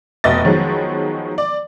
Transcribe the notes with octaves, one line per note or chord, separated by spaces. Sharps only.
F1 B2 B3 D#5 E5 A6
D#3 F3 F#3 G#3 B3
D5